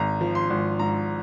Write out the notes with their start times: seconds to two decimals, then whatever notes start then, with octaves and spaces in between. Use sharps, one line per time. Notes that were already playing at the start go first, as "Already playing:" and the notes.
Already playing: G#1 A#5
0.21 F3
0.35 C6
0.50 G#1
0.79 G#2 A#5